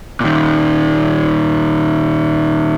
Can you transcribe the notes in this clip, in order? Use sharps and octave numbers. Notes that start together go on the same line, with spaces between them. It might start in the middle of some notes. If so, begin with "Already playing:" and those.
A#2 D#3